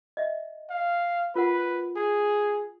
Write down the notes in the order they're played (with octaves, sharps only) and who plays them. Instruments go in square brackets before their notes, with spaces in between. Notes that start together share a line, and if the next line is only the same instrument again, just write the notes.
[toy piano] D#5 E5
[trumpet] F5
[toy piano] F4 A#4 F#5 [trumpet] B4
[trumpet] G#4